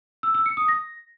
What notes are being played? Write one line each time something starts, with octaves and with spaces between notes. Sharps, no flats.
E6
E6
C#7
D#6
A#6